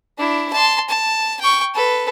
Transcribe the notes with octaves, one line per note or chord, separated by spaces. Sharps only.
D4 E4
A5 C6
A5
G5 C#6
A4 B4